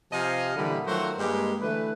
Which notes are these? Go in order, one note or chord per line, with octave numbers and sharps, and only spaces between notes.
C3 F3 G4 D#5 F5 G#5
A#2 D3 E3 G3 D#4 B5
D#3 F3 F#3 A3 F#4 C5
G2 G#3 A#3 G4
D3 E3 A3 B4